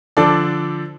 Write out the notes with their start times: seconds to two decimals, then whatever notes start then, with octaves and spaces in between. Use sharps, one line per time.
0.17 D3 F3 D4 A4 D5